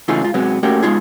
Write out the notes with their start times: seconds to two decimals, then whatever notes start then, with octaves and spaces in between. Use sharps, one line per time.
0.08 C#3 E3 A3 D#4 F4 G#4
0.22 G#2 F4
0.34 C3 F#3 G#3 B3
0.63 A2 A3 A#3 C#4 F#4 G4
0.83 G#3 B3 D#4 F4 G#4